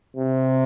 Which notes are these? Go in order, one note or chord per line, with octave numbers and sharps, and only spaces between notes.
C3